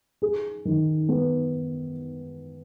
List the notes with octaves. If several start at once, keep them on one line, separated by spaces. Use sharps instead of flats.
G#4
D#3
B3